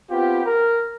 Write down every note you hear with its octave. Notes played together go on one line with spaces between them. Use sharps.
B3 C4 F4 G4
A#4